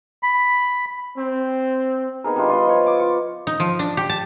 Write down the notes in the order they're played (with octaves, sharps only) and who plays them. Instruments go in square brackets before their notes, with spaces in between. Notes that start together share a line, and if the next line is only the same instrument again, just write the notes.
[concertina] B5
[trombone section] C4
[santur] B3 D#4 G#4 A#4
G3 D4 F4
F4 D#5 B5
F3 C#5
D6
F4 C#6
[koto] D#4
F3
D4
G4
A5